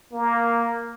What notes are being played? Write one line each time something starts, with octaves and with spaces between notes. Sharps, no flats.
A#3